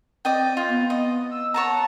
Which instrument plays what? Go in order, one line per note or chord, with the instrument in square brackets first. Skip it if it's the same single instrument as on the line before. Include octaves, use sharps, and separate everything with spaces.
[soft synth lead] C4 [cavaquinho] D5 D#5 G5
[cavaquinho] F4
[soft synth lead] B3
[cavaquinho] D#5
[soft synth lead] E6
[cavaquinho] C#5 A5 A#5 [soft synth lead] F#5